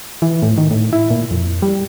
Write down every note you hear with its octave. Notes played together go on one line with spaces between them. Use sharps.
E3
A2
D#3
A2
E4
A#2
F2
G3